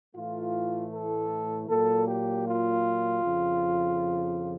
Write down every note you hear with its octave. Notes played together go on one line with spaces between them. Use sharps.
A2 E3 A3 F4
A4
A#2 F#3 A#3 A4
G4
F4
F2 C#3 F3